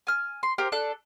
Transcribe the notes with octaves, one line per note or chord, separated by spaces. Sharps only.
G#5 F6
C6
G4 A#4 C5
D4 A4 F#6